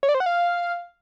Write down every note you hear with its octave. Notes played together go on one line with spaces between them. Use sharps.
C#5
D5
C5
F#5
F5